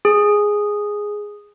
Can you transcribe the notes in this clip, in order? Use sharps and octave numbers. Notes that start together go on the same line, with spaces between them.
G#4